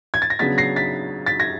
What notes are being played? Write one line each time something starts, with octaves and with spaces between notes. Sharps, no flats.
G#6
A6
A#6
C#3 F#3 B3 D4 A6 B6
A#6 C7
A6 B6
A6 B6
G#6 A#6